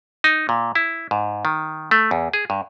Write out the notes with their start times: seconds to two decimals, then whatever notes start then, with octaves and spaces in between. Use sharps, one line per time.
0.24 D#4
0.49 A#2
0.75 E4
1.11 G#2
1.45 D#3
1.91 A3
2.11 E2
2.33 G#4
2.50 G2